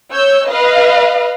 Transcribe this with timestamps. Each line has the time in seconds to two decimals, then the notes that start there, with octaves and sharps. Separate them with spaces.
0.11 C#5 E6 G6
0.48 B4 D#5 F5